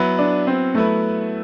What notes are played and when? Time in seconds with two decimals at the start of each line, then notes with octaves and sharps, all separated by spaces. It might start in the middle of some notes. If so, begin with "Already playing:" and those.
Already playing: F#3 B3 E4 B4
0.19 D4
0.47 C4
0.75 F#3 A3 B3 E4 B4